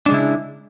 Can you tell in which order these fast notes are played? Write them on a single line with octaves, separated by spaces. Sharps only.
D4 G#3 C#3 E4